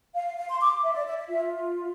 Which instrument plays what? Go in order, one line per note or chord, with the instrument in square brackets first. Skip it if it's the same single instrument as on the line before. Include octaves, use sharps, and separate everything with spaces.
[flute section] F5
F5
C6
D6
E5
D5
E5
E5
F4 E5